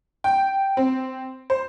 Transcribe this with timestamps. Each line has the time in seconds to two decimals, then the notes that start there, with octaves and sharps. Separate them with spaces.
0.24 G5
0.77 C4
1.50 C5